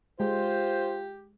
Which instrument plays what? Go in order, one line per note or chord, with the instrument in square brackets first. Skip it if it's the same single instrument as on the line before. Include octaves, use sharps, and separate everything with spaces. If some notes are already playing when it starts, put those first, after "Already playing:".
[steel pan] G#3 [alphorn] F4 [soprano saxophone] G4 [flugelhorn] C5